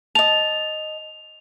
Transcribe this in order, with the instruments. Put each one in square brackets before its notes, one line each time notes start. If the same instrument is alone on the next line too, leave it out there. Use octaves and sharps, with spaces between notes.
[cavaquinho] D#5 A5 [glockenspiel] F7